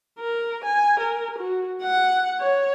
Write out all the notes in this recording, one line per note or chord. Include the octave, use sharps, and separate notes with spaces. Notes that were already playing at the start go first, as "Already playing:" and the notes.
A#4
G#5
A#4
F#4
F#5
C#5